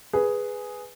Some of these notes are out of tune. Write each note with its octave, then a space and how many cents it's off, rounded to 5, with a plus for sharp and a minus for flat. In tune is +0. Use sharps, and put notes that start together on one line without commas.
G#4 +0 B4 +0